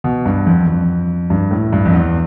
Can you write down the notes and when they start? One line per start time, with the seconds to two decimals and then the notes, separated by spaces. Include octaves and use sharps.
0.04 B2
0.26 G2
0.46 F2
0.67 F2
1.30 G2
1.51 A2
1.73 G2
1.85 F2
1.93 E2